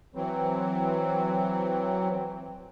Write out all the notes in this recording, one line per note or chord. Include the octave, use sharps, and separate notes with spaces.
E3 F#3 C4